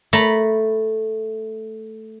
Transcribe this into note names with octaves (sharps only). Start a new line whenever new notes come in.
A3 A#5 B5